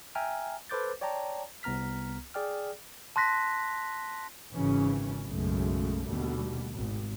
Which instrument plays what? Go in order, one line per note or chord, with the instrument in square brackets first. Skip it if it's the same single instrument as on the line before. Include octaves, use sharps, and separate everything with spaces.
[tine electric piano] E5 G5 G#5 A#5 F6
A4 B4 C5 D6 G6 A6
C#5 D5 G5 A5 A#5
C2 B3 A#5 F6 B6
G#4 D5 G5 F6
[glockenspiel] A5 C6 F#6 A#6 B6
[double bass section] G#1 C#3 E3 C#4
B1 F#2 C#3 G#3 A3
D#2 B2 D3 G3 A3
G#1